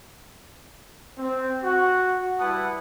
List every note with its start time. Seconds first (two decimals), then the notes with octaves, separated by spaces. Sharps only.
1.19 C4
1.63 F#4
2.40 G3 E4 B4 F#5 A5 D#6